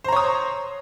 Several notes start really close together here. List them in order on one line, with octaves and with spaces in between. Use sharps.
C5 A#5 C#5 D#6